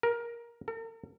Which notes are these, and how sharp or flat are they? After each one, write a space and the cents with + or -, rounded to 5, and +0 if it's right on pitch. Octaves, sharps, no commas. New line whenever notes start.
A#4 +15
A#4 -45